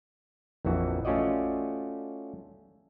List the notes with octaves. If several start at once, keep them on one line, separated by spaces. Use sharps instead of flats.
A#1 F2 E3 F#4
A3 C#4 F4 F#4 D5 D#5